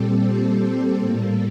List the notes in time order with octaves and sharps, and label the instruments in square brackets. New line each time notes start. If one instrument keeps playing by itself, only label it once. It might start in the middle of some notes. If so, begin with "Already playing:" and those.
Already playing: [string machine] A#2 G3 C4 G4 A4
C5
A2 G3 A#3 A4